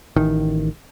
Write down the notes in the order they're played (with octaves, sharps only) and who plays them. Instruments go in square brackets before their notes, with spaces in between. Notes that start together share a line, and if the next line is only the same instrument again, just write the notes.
[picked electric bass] A1 D#3